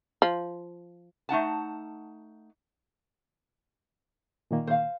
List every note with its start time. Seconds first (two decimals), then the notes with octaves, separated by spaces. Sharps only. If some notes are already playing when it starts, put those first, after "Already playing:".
0.22 F3
1.29 A3 D#4 F#5 A5
4.51 A#2 D#3 A#3
4.67 C5 F5